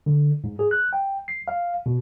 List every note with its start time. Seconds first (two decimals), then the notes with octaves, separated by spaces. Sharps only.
0.06 D3
0.44 G#2
0.59 G#4
0.71 F#6
0.93 G5
1.28 C7
1.48 F5
1.86 B2